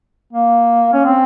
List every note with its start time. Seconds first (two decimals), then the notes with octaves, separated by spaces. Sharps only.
0.33 A#3
0.93 C#4
1.05 C4